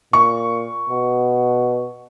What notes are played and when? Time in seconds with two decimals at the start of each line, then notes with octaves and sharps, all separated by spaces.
0.13 A#2 C#6
0.90 B2